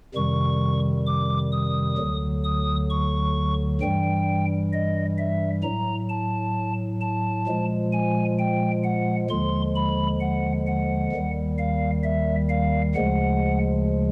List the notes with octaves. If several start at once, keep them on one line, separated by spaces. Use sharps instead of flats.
F2 C3 D#3 G3 C#6
D6
D#6
D2 D3 F#3
D#6
C#6
G2 E3 G3 G5
D#5
E5
A2 F#3 A#5
A5
A5
A#2 F3 G#3
G#5
G5
F#5
D#2 D3 F3 G#3 C6
B5
F#5
F#5
D#2 D#3 G3
F5
E5
F5
D2 C#3 F3 G#3 F#5